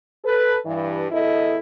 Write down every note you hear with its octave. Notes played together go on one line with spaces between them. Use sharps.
A4 B4
G2 E3
E2 E4 A4 D#5